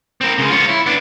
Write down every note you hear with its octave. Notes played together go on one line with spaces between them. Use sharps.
C4 A#4
C#3 G#3
F4 C#5
E4
B3 D4